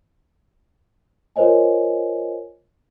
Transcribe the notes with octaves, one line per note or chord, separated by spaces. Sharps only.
F4 A#4 C5 C#5 D#5 G#5